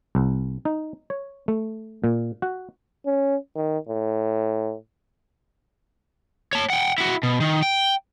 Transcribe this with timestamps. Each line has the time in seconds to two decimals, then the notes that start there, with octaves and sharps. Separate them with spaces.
0.15 C2
0.65 D#4
1.10 C#5
1.48 A3
2.04 A#2
2.42 F#4
3.06 C#4
3.55 D#3
3.89 A2
6.53 C#5 A5
6.70 F#5 G5
6.98 E4 F#4
7.23 B2
7.40 D#3
7.62 G5